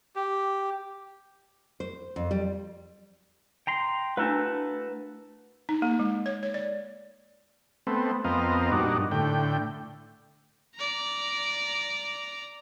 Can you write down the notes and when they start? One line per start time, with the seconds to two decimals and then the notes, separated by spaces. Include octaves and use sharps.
0.16 G4
1.80 C5
2.16 F2
2.31 G3
3.67 G5 A#5 C6
4.17 A3 D4 E4 F#4 A#4 B4 F5 A5
5.69 D#4
5.82 A#3
5.99 G#3
6.26 C#5
6.43 C#5
6.54 D5
7.87 A3 B3 C4
8.24 F2 B3 C4 A#4 D#5 F5
8.72 G2 A#2 D4 D#4 F#4
9.11 A2 D3 G5
10.75 D5 A#5